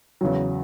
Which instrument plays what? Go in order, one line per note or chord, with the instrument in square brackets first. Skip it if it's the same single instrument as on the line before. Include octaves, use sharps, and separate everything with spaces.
[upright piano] E2 C#3 F#3